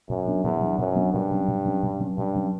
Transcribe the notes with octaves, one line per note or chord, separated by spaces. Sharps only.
F#2 B2
F#3 B3 D4
E2 B2
F#3 B3 D4
F#2 B2
F#3 B3 D4
G2 B2
F#3 C#4
B2
F#3 C#4
B2
F#3 C#4
G2 B2
F#3 C#4